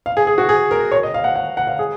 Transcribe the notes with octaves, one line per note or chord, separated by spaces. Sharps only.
F5
G#4
G#4
F#4
G#4
A#4
C#5
D#5
F5
F#5
F#5
F#5
F5
G#4